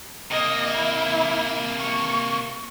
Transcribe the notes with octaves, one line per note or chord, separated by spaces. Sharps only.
C3 A#3 D#5
E4
C#6